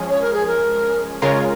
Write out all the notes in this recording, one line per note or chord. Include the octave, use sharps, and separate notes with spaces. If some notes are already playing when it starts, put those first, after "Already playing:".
Already playing: F3 G#3 C#4 G#4
C#5
A#4
G#4
A#4
C#3 G#3 F4 A#4 C#5